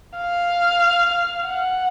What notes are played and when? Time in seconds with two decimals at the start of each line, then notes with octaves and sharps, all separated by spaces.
0.18 F5
1.45 F#5